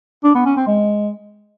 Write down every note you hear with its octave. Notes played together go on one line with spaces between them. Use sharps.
D4
B3
C#4
C4
G#3